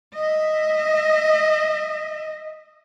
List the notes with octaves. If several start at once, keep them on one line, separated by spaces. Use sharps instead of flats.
D#5 E5